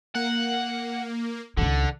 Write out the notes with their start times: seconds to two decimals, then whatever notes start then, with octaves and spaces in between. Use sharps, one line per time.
0.15 A#3 F#5
1.57 C#2 D3 D#3